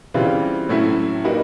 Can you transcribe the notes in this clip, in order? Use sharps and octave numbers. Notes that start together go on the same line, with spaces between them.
C#3 E3 G3 C4 F4
A2 F#3 A3 C#4 E4
G3 A#3 D#4 F#4 B4